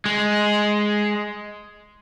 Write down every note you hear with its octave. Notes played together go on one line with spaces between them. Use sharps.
G#3